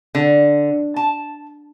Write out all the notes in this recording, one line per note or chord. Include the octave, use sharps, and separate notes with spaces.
D3
A5